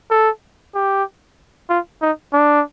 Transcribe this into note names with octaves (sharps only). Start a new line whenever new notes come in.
A4
G4
F4
D#4
D4